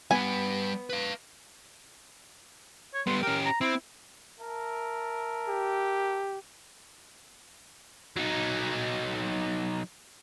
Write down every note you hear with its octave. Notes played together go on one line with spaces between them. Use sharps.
G3 B3 B4 G#5
B4 F5
C#5
G3 B3 C6
C#4 G4 A#4
A#5
C4 E4
A#4 E5 A5
G4
F#3 D#4